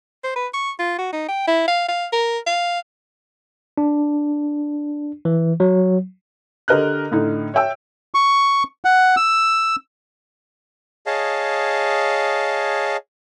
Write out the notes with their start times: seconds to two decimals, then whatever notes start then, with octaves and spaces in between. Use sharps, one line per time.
0.24 C5
0.36 B4
0.54 C#6
0.79 F4
0.98 F#4
1.13 D#4
1.28 G5
1.47 E4
1.68 F5
1.88 F5
2.12 A#4
2.47 F5
3.78 D4
5.25 E3
5.60 F#3
6.68 D3 G4 A#4 D#5 F6 F#6
7.12 A2 D3 D#4
7.54 C#5 E5 G5 E6
8.14 C#6
8.85 F#5
9.17 E6
11.06 G#4 C#5 D#5 F5 A5